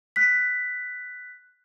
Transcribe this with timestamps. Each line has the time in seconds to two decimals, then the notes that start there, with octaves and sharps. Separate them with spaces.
0.16 F#6 B6